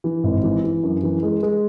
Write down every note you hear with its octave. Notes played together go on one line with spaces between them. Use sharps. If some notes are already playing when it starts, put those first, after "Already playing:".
E3
G#1
E3
E3
F#2
E3
G#3
G#3